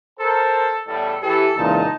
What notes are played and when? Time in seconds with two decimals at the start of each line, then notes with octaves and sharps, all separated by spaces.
0.20 A4 A#4 C5 A5
0.87 E2 A2 G3 A4
1.23 E3 G4 A4
1.57 C#2 A#2 E3 D#4 A5